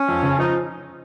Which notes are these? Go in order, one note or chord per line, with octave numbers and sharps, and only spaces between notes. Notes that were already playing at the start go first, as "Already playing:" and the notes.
Already playing: C#4
F2
C#3
F3 D#4